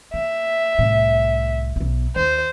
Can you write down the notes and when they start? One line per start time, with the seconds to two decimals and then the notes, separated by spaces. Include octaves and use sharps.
0.14 A#3 E5
0.79 C2 A2
1.76 B1 B3
2.16 D#2 C5